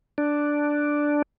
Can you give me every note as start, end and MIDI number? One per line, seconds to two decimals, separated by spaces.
0.18 1.22 62